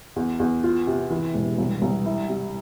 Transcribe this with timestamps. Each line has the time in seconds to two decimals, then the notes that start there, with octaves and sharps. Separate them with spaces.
0.16 E2
0.40 E2
0.64 F4
0.87 C3
1.10 E3
1.35 E1
1.58 C2
1.82 C2
2.06 E4
2.29 C3